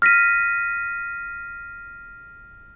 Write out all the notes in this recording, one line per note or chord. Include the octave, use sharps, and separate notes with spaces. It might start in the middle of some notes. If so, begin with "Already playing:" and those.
F6 A#6 B6 D#7